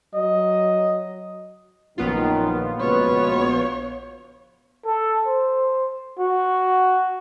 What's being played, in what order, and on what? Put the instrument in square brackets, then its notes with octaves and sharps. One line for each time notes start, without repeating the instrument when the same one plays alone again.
[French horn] F#3 [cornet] D#5
[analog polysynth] A#1 B3 F4 [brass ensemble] F#2 D#3
[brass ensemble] C#2 B2 B4 [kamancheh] C#5
[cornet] A4
C5
F#4